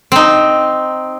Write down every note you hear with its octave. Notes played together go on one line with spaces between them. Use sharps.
C4 D#4